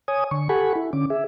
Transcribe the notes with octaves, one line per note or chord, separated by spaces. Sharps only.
C#5 G#5 D#6
D3 C#6
G4 A4 F#5 G#5 B5 C#6
E4
D3 C#4 D6
G#4 E5